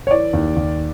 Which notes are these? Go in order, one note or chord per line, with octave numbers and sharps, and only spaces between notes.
C#5
E3 D5
D#2
D#2